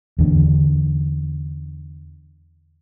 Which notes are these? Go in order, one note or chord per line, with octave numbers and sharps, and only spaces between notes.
E2 D3